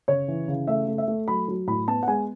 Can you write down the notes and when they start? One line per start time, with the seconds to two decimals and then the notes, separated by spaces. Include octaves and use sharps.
0.08 C#3 C#5
0.28 E3
0.48 C#3
0.67 A3 E5
0.88 A3
0.98 E5
1.08 A3
1.28 F#3 B5
1.48 F#3
1.67 A2 B5
1.87 B3 A5
2.03 F#5
2.07 G#3 G#5